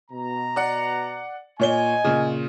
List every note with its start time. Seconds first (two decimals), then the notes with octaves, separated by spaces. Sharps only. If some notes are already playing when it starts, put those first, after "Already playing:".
0.11 B2 A#5
0.56 D5 F#5
1.60 A#2 C#5 D#5 G#5 G7
2.04 A#2 C#3